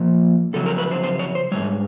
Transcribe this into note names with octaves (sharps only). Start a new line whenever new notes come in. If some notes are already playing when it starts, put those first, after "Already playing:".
Already playing: A#2 F3
F2 C#3 F#3 A4
A#4
B4
C5
C5
C#5
C5
G#2 D#3 G3 C#5